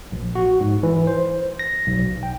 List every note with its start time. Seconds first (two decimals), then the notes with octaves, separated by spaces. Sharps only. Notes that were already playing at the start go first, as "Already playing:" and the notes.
0.12 A#1
0.35 F#4
0.60 G#2
0.83 E3
1.07 C5
1.59 A#6
1.87 B1
2.23 G5